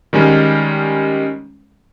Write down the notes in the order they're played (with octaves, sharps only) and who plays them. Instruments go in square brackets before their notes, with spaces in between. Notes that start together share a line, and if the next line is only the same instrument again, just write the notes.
[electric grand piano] D#3 G3 G#3 C#4